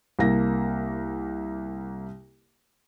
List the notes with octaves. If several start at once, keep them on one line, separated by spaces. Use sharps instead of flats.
C2 A#3 A#6